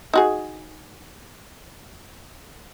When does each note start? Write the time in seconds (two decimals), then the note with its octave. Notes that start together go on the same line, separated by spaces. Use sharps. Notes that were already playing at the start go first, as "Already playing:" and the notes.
0.13 D#4 F#4 G#4